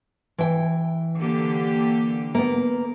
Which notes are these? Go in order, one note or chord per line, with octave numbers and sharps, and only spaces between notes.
E3 G5
D3 A#3 G4
A#3 B3